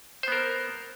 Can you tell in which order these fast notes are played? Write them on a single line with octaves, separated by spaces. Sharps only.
C5 B3 A#4